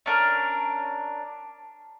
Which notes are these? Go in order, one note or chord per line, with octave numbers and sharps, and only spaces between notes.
C#4 D4 A#4